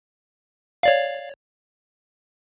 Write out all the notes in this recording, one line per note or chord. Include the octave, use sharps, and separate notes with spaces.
C#5 D5 F5